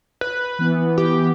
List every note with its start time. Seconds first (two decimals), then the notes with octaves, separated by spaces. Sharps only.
0.21 B4
0.59 E3 B3
0.98 G4